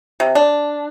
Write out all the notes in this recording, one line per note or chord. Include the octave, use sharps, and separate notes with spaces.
C3
D4